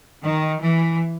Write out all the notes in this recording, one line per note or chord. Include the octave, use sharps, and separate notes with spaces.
D#3
E3